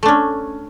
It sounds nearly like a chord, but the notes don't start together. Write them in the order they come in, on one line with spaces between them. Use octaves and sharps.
A3 D4 C#4